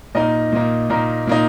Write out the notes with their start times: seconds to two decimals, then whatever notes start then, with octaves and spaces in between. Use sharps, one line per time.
0.15 A#2 A#3 D#4 A#4 D#5
0.52 A#2 A#3 D#4
0.90 A#2 A#3 D#4 A#4
1.27 A#2 A#3 D#4